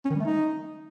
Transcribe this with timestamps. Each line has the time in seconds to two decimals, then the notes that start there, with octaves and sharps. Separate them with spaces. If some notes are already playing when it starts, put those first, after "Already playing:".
0.05 C#4
0.10 D#3
0.15 G3
0.20 A3
0.25 D#4